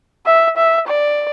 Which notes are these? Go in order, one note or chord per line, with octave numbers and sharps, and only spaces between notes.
E5
E5
D5